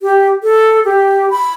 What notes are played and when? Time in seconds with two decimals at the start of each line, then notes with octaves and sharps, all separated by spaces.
0.01 G4
0.43 A4
0.85 G4
1.30 B5